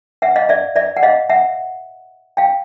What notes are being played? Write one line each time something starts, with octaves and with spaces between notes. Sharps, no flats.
E5 F#5
D#5 F5
D5 E5
D5 E5
F#5
D#5 F5
E5 F#5
F5 G5